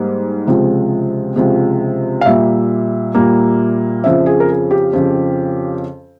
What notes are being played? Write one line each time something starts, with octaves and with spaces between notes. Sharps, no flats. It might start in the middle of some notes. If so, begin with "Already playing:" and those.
Already playing: G#2 G3 A#3
C#2 C3 F3 G#3
C#2 C3 F3 G#3
F5
A#2 G3 A#3 E5
A#2 G3 A#3
F2 C#3 F3 E5
G#4
A#4
G#4
G4
F2 C#3 F3